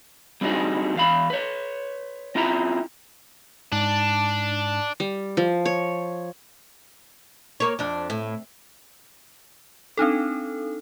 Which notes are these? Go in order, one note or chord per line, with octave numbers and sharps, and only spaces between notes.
G3 C4 D4 D#4 F#4 G#4
E2 F5 B5
B4 C#5
C4 E4 F4 E5 A#5
G#2 D4
G3
F3
C#5
A#3 C#5
F2 D4
A2
C4 D4 D#4 A4